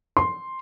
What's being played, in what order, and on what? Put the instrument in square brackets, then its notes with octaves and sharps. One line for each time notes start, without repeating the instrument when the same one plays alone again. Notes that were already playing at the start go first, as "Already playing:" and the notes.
[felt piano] C6